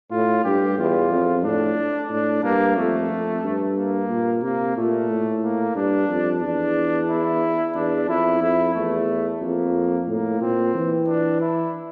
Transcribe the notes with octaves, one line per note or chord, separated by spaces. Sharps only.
A2 F4
G2 G4
E2 F4
F2
A2 D4
A2 D4
G2 A#3
F2 A3
F2
G2
A#3
A#2
C3 A#3
A#2 A3
A2
A#3
G2 D4
F2
E2 D4
E4
E2 D4
F2 E4
F2 E4
E2 A3
F2 A#3
A2 A#3
A#2 C4
E3
D4
E4